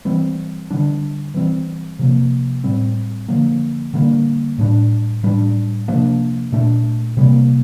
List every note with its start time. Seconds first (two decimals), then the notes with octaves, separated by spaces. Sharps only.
0.05 E3 G3 C4
0.71 D3 G3 D4
1.34 E3 G3 C4
1.99 C3 F3 A#3
2.64 A2 G3 C4
3.28 D3 F3 A#3
3.94 D3 G3 A#3
4.58 A2 G3 D4
5.23 A2 G3 D4
5.88 C3 F3 A#3 D4
6.52 A#2 A3 D4
7.17 C3 G3 A#3